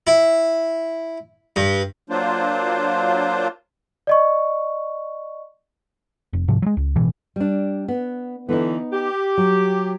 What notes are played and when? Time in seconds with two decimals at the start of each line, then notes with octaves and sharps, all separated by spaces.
0.07 E4
1.56 G2
2.10 F#3 A#3 D4 F4 C5
4.07 D5 D#5 C#6
6.33 F1
6.48 G#2 C3 F3
6.62 F#3 G#3
6.77 C#2
6.96 A1 B2 E3
7.36 G3 D4
7.88 B3
8.49 D3 E3 B3 D#4
8.93 G4
9.38 F#3